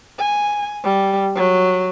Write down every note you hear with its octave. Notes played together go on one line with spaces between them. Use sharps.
G#5
G3
F#3